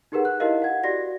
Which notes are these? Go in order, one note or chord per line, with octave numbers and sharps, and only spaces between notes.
D#4 G4 G#4 A#4 B4 F#5
F#6
E4 G4 A#4 D#5 F5
F#5 G#6
F#4 G4 D5 A#6